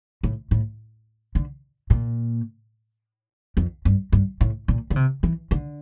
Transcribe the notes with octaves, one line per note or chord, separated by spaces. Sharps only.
A2
A2
D3
A#2
F2
G2
G2
A2
A#2
D3
C3
E3
D3